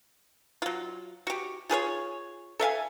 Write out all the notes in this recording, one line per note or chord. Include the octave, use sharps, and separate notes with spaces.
F#3 F4
F#4 G4
F4 G#4 B4 C#5
A4 E5 F5 G#5